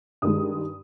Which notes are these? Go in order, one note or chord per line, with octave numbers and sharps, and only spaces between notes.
G2 D#3 G#3 D#6